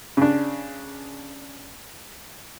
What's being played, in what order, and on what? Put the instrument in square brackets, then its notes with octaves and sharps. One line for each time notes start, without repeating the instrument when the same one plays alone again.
[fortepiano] C#3 D4